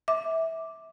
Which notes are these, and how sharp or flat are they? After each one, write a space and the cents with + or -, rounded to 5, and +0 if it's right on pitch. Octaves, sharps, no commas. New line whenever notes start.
E5 -20 D6 +0